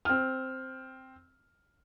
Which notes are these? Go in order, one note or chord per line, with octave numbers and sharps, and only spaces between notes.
C4 F6